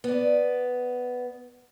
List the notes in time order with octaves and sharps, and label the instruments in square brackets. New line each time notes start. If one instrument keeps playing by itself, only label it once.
[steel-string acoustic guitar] B3 D5